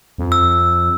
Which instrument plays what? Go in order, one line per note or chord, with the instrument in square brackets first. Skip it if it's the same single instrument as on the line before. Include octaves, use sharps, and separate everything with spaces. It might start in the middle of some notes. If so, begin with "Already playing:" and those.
[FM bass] F2
[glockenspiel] E6